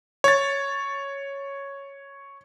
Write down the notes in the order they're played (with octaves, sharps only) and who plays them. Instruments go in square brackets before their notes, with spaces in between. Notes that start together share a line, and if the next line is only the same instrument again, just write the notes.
[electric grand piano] C#5 A6